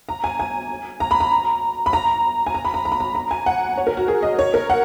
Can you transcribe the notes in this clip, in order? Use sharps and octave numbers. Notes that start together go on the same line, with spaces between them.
A#5
G#5
G#5
A#5
B5
A#5
B5
A#5
G#5
A#5
B5
A#5
A#5
B5
A#5
A#5
G#5
F#5
C#5
A#4
F#4
G#4
D#5
C#5
A#4
F#5